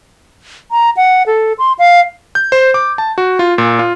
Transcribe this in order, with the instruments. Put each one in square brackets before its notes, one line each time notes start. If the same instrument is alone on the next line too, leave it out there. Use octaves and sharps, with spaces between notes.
[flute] A#5
F#5
A4
C6
F5
[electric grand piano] G6
C5
D6
A5
F#4
F4
A#2
F4